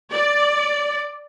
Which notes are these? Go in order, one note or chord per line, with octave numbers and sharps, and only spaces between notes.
D5